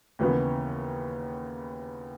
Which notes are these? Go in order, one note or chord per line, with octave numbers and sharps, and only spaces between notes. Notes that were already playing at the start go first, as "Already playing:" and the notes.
D#2 C#3 E3 B3